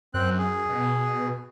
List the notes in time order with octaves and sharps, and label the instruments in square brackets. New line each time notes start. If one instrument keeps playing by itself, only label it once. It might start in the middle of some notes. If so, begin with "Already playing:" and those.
[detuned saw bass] F#2 [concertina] C4 F#6
[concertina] G#4
[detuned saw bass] B2